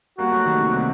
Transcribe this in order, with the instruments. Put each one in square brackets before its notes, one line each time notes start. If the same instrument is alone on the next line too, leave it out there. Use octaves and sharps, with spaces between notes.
[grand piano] G3 A#3 [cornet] F#4
[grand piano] F#3 A3
D#3 G3
C3
C3 D#3